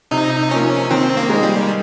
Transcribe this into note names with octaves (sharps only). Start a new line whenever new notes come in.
C3 D#4
F3 A#3 C#4
D#3 C4
A#3
G#3 D#4
G3